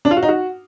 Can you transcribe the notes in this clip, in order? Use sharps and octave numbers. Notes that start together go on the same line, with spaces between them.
D4
F4
F#4
D#4
F#4